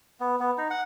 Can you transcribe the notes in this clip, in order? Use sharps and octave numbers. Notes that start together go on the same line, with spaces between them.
B3
B3
D#4
F#5